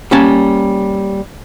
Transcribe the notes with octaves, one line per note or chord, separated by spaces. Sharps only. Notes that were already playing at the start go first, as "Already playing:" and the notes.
G3 A#3 C#4 G5 A5